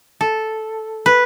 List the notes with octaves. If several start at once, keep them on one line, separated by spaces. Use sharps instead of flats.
A4
B4